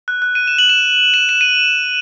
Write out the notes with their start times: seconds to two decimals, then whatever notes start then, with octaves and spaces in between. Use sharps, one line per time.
0.08 F#6
0.22 F#6
0.35 D#7
0.47 E7
0.58 F#7
0.69 E7
1.14 E7
1.29 E7
1.41 D#7